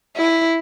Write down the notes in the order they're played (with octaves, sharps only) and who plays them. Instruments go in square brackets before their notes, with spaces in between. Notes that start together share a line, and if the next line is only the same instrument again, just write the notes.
[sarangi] E4